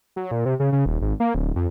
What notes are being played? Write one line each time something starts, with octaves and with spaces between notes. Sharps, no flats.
F#3
A#2
C3
C#3
C#3
D#1
G#1
A#3
D1
F2